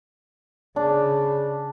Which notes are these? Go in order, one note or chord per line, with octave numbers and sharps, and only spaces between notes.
C#3 D4